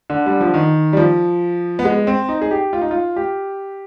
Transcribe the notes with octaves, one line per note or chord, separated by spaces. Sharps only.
D3
G3
F3
D#3
G3
F3
B3
G#3
C4
D#4
G#4
G4
F4
D#4
F4
G4